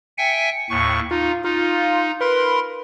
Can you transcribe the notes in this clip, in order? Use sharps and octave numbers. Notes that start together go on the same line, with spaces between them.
E5 G5 G#5 C#7
D#2 A2 C#6
D#4 F4
D#4 F4
A#4 B4 C6